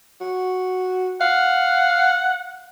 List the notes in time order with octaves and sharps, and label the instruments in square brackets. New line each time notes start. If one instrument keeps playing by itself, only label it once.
[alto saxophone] F#4
[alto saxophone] F5 [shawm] F#5